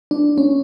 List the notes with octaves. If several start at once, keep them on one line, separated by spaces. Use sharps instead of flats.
D4
C#4